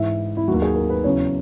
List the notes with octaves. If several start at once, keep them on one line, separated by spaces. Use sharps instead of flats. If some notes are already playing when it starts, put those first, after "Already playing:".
Already playing: G#2 E3 E5
E4
D#2 D#3 F#3 F#4
G#4
A#4
B4
E2 C#3 F#3 C#5